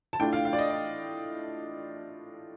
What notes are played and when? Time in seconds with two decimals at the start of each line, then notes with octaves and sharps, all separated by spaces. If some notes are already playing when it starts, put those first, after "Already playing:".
0.13 A5
0.19 A2 A3 D4 F4 G5
0.33 F5
0.45 F5
0.53 D5
0.58 D#5
0.71 D5